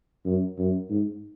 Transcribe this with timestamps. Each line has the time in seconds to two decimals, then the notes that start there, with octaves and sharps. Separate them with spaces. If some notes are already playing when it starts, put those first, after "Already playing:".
0.26 F#2
0.58 F#2
0.90 G#2